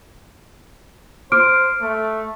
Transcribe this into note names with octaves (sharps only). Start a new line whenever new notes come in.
C5 D6 F6 D7
A3